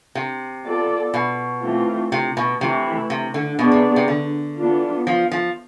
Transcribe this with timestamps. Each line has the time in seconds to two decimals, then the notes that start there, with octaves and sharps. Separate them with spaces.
0.15 C3
0.65 B3 F4 A4 D5
1.14 B2
1.62 E3 A3 C4 F4
2.12 C3
2.37 B2
2.61 C3 E3 A3 E4
3.10 C3
3.34 D3
3.59 B2 B3 D4 G#4 D5
3.72 C3
3.96 C3
4.08 D3
4.57 E3 B3 D4 F4
5.07 F3
5.31 F3